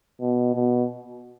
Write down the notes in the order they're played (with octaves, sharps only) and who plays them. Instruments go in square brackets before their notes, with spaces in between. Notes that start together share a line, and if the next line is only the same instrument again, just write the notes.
[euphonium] B2
B2